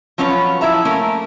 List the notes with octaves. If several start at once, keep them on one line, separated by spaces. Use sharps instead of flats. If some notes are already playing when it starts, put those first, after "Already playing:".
F3 F#3 C#4 F4 B4 C#5
F3 E4 E5 A#5
A3 A#3 C#4 A#4